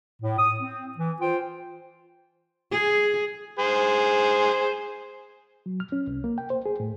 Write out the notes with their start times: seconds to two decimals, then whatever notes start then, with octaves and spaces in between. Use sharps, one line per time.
0.22 A2
0.38 D#6
0.60 C4
0.98 E3
1.21 F4 C5 G5
2.71 G#4
3.59 G#4 C5
5.66 F#3
5.80 F6
5.92 C#4
6.07 C2
6.24 A#3
6.38 G5
6.50 C5
6.66 G#4
6.80 A2